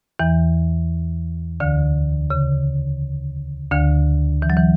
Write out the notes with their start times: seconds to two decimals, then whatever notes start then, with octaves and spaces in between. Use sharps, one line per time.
0.19 E2 E3
1.60 D2 D3
2.30 C#3
3.71 D2 D3
4.42 E3
4.50 F#3
4.57 E3